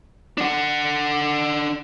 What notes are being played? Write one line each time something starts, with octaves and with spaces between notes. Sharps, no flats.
D4 F#5